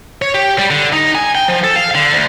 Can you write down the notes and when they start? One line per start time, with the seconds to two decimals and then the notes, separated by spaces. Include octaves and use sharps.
0.22 C#5
0.34 G4
0.58 G3
0.70 D3
0.93 D#4
1.15 G#5
1.35 G5
1.48 F3
1.64 A4
1.76 F5
1.95 D3
2.12 D2